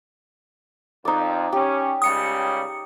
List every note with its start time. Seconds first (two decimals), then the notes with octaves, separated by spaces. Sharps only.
1.05 F2 D#4 D5
1.52 C#4 G4
2.02 C#2 C#3 G3 D#6 C#7